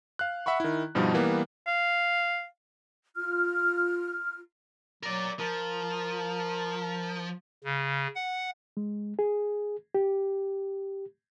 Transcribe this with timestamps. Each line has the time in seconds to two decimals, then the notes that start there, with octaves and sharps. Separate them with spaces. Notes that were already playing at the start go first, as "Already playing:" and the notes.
0.19 F5 F#6
0.46 E5 F#5 B5 C#6
0.60 D#3 E4
0.95 G2 B2 F3 G3 D#4
1.14 E3 G3 A#3 B3
1.67 F5
3.16 F4 F6
5.03 F#3 A#4 D5
5.39 F3 A#4
7.64 C#3
8.15 F#5
8.77 G#3
9.19 G#4
9.95 G4